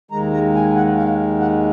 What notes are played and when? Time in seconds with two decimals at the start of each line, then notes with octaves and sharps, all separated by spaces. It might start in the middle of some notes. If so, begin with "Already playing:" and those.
0.11 D#2 D#3 G#3 A#5
0.33 A#5
0.54 G#5
0.76 F#5
0.97 F5
1.40 F#5